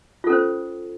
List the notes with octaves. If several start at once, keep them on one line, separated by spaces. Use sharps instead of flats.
C#4 F4 A4 C5